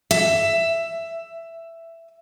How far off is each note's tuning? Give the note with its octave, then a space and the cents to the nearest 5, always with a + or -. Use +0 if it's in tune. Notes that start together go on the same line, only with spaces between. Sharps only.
E5 +10